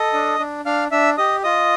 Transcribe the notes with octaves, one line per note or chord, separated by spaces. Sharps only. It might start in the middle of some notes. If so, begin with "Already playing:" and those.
Already playing: A4 D#5 D#6
D4
D4
D4 F5 F6
D4 E5 E6
G4 D#5 D#6
F4 D#5 D#6